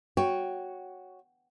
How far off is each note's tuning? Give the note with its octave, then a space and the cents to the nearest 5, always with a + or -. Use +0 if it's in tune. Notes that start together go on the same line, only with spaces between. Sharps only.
F#4 +0 C#5 +0 G5 +5